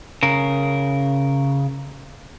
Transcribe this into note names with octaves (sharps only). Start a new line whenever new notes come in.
C#3 A#4